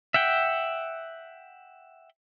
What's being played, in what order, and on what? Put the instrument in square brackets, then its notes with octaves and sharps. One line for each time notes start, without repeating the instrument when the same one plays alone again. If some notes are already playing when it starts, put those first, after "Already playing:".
[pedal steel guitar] E5 F#5 G5